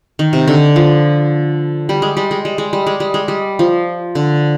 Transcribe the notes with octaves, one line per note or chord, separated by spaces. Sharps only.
D#3
C3
D3
F3
G3
G#3
G3
G#3
G3
G#3
G3
G#3
G3
G#3
G3
F3
D3